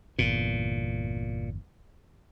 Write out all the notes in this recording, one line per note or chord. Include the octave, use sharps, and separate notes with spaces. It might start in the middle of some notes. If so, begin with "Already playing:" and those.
G1 E2 A#2